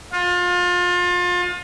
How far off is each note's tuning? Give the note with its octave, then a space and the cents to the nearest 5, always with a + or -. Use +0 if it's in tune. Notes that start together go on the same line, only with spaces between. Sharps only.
F4 +30